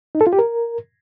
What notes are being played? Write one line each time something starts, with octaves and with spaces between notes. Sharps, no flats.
D#4
A4
F4
G4
A#4